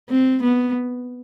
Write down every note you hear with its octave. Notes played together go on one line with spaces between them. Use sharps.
C4
B3